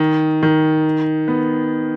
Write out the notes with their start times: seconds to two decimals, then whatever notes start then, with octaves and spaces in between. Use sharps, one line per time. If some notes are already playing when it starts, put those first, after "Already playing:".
Already playing: D#3
0.43 D#3
1.28 B3